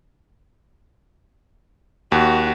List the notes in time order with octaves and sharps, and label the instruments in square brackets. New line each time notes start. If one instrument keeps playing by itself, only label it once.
[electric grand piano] D#2 [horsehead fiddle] F#4